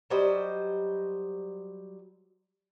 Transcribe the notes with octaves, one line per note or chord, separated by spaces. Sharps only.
F#3 G3 C5 D#5